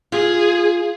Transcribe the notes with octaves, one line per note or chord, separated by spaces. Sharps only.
F4 G#4